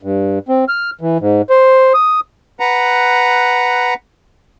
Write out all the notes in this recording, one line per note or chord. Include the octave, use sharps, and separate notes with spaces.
G2
C4
F6
E3
G#2
C5
D#6
B4 F#5 A#5